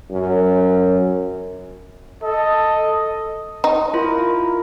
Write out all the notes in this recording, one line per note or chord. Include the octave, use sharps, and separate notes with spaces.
F#2
A4 D#5
D#4
E4 F4 A#4